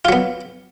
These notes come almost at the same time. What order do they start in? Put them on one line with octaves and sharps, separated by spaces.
F4 F#3 B3